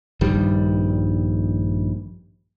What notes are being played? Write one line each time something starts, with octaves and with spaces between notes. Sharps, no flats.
A#1 G2 D#3 G3